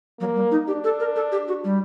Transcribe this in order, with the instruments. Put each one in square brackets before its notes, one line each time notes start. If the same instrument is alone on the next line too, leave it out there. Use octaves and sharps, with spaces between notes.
[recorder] F#3 [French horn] A#3
[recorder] G3
D#4
[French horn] D4 [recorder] G4
[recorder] A4
A#4
A4
G4
F#4
G3